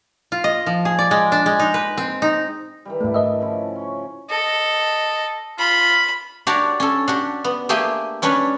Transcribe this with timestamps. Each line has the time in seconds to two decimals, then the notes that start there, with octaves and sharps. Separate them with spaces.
0.32 F4
0.44 D#5
0.66 F3
0.85 G#4
0.99 D5
1.11 G#3
1.32 D4
1.46 G#3
1.59 D#4
1.74 B4
1.97 C4
2.22 D#4
2.85 D#3 E3 G3
3.01 G#2 A3 D4 E4
3.14 D#3 B4 D#5 E5 A5 B5
3.41 C#3 F3 E4
3.76 C#4 C#5
4.30 A4 D#5
5.58 F4 B5
6.47 D4 F#4 G4 A#4 C#5 D5
6.80 C#4 A4
7.08 D4 F#4 G4
7.44 B3
7.69 A3 A#3 G4 G#4 G5 G#5
8.22 G3 C#4 D4 B4 C#5